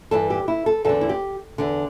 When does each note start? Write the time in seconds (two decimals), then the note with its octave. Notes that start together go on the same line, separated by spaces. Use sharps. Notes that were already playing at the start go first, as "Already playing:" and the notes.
0.11 G2 E3 A4
0.30 G4
0.48 E4
0.66 A4
0.85 E2 D3 A4
1.01 E4
1.09 G4
1.58 E2 D3